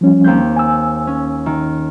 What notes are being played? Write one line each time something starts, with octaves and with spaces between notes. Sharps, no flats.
F3 G3 C#4
D#2 C4 G6
G#5 E6
C#4
D#3